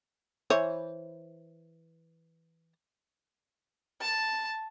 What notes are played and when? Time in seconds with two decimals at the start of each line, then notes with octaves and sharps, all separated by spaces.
0.50 E3 C5 C#5
4.01 A5